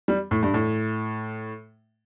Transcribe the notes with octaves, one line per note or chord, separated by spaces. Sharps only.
G3
A2
G2
A2